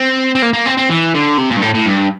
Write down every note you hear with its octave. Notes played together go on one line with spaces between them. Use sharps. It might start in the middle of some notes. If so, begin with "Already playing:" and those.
Already playing: C4
C4
A#3
A#3
C4
C4
E3
D3
C3
A#2
G2
A2
A2
G2